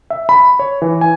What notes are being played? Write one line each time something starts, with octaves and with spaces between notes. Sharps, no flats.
E5
B5
C#5
E3
G#5